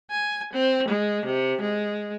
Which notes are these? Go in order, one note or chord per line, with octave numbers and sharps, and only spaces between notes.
G#5
C4
G#3
C3
G#3